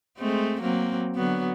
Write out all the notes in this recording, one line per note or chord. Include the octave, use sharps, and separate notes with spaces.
G#3 A3 C4
F#3 A#3 C4
D3 F#3 B3